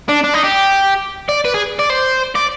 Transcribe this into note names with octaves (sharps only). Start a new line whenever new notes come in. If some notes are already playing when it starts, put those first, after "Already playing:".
D4
D4
D#4
G4
D5
B4
G#4
D5
C5
D5